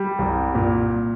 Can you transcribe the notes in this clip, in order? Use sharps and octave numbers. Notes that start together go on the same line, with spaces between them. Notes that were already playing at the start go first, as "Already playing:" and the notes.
Already playing: G3
C2
A#2